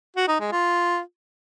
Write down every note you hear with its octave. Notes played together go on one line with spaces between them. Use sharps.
F#4
D#4
G#3
F4